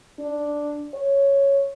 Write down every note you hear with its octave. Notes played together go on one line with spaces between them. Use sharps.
D4
C#5